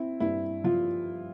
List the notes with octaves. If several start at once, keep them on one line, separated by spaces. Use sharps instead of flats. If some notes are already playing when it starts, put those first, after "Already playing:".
Already playing: C4 E4
G2 E4
F3 F4